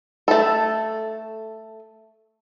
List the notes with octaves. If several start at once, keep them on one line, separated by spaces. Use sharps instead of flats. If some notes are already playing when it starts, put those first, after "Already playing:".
A3 A4